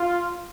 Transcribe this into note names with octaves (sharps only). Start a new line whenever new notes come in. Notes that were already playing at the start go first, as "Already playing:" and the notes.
Already playing: F4